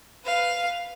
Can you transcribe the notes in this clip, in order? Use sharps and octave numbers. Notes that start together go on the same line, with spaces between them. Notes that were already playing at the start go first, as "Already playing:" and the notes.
B4 F5